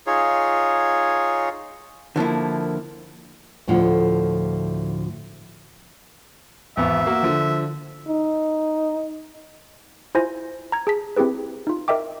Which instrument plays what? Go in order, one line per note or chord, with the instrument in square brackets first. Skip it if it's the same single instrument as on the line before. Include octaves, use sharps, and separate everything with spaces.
[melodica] D#4 F4 G#4 C#5
[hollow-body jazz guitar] D3 F3 A#3 E4
[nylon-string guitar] D2 A2 D3 F3 F#5
[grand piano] G#1 E2 B3 [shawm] E5
[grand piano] A#3 F#4
D3 F3
[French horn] D#4
[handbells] E4 F4 C5 G#5 A#6
A#5 G#6
G#4 A5 B6
C4 E4 G4 G#4 B4
D#4 F4
A#4 D#5 E5 G5 D6